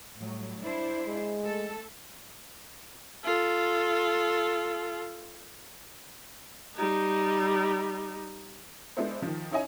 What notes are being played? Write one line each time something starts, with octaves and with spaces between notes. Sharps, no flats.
A2 F#3 G3
D4 E4 C5
G#3
A3 A4
F4 A4
G3 D#4
G#3 B3 D4 E4 A4 C5
D#3 F3
C#4 D#4 E4 C#5 D#5 G#5